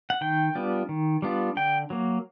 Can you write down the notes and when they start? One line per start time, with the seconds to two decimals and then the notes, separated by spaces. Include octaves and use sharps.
0.10 F#5
0.21 D#3 G5
0.55 G3 B3 D4 F4
0.89 D#3
1.22 G3 B3 D4 F4
1.57 D3 G5
1.90 F#3 A#3